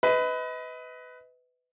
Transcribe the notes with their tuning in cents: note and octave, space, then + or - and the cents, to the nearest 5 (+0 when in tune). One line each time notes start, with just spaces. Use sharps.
B4 +20 D#5 +35